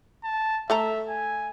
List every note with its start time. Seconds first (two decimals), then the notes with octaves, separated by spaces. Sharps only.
0.24 A5
0.70 A3 A4 E5 A#5
1.09 G#5